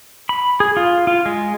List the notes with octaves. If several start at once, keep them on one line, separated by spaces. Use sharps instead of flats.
B5
G#4
F4
F4
G#3